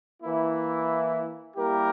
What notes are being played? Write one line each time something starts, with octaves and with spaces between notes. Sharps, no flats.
E3 A#3 E4
G3 A#3 E4 G4 A#4